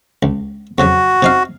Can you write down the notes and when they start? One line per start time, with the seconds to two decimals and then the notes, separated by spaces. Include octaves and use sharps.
0.23 C#2
0.78 F2 C#3 F#3 F#4
1.22 C3 D#4 F5